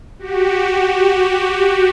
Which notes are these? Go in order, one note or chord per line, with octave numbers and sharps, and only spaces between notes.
F#4 G4